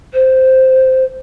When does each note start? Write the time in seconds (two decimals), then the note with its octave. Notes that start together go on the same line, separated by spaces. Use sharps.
0.13 C5